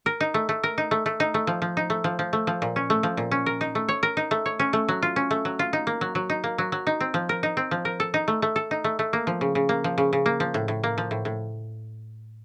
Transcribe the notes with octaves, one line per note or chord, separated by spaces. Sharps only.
A#4
D#4
A3
A3
A#4
D#4
A3
A3
D#4
A3
F3
F3
D#4
A3
F3
F3
A3
F3
A#2
C#4
A3
F3
A#2
C#4
A#4
D#4
A3
C#5
A#4
D#4
A3
C#5
C#4
A3
F#3
F4
C#4
A3
F#3
F4
D#4
A#3
F#3
F#3
D#4
A#3
F#3
F#3
D#4
C4
F3
A#4
D#4
C4
F3
A#4
A4
D#4
A3
A3
A4
D#4
A3
A3
A#3
F3
C#3
C#3
A#3
F3
C#3
C#3
A#3
F3
A2
A2
A#3
F3
A2
A2